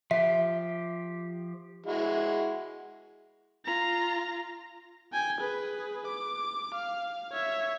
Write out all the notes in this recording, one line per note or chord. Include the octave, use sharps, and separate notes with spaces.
F3 G4 E5
G#3 E4 F#4
F4 A#5
G5 G#5
G#4 B4
D6
F5
C#5 E5